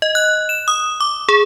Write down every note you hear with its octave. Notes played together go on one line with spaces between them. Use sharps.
D#5
F#6
E7
D#6
D6
G#4